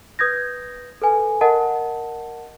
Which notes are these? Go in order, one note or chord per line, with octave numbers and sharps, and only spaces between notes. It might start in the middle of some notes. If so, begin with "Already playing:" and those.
B4 D#6 G6 G#6 A#6
A4 B4 G#5
A#4 D#5 F#5 A5